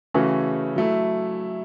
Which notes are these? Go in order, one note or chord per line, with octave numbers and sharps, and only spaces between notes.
C#3 E3 A3 C#4 F#4
F#3 A3 E4